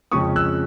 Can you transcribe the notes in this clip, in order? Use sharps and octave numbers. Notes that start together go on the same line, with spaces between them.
F2 C#3 F3 G#3 C#4 C#6 D#6
E6 F#6